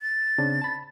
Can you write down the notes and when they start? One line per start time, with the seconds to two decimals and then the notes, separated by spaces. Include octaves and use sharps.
0.01 A6
0.38 C#3 C4 D4
0.62 A5 B5